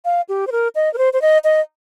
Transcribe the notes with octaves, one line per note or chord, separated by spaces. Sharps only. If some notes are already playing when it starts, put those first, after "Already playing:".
F5
G4
C5
A#4
D#5
A#4
C5
C5
D#5
D#5